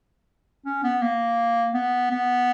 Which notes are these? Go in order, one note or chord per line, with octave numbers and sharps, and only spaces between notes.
C#4
B3
A#3
B3
B3